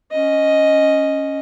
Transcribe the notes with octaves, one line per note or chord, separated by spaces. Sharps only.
C#4 D#5